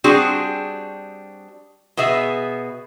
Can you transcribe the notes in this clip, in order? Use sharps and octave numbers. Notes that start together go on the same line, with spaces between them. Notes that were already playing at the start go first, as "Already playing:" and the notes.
G3 C4 D4 F#4 G#4
B2 B3 G#4 E5